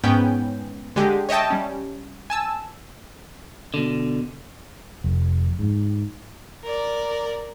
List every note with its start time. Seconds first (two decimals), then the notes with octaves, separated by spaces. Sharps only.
0.03 G#2 B3 C#4 G5 G6
0.96 D3 G#3 G4
1.29 C#5 D#5 E5 G5 A5
1.50 G3 C#4
2.30 G#5 A5 E6
3.74 B2 D3
5.04 F1
5.59 G#2
6.64 A#4 D5